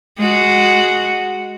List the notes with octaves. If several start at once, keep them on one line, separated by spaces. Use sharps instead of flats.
G#3 F#4